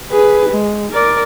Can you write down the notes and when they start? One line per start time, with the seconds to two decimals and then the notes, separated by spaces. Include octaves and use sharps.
0.12 G#4 B4
0.50 G#3
0.92 A#4 D5